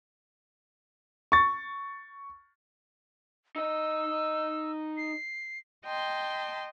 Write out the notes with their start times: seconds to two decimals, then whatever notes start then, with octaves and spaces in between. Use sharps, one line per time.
1.32 C#6 A6
3.56 D#4 D#5 E6
4.97 C7
5.84 D#5 G5 A5 C6